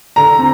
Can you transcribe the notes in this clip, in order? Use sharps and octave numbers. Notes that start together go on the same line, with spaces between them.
D3 A#5
C4